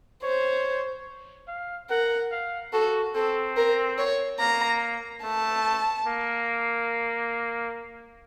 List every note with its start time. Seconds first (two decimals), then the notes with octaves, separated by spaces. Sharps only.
0.23 C5 C#5
1.48 F5
1.90 A#4 F#5
2.31 F5
2.73 F#4 A4
3.15 C4 A4
3.57 A#4
3.98 C#5
4.40 A#3 A#5
5.23 A3 A5
6.07 A#3